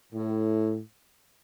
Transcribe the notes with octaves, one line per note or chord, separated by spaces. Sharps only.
A2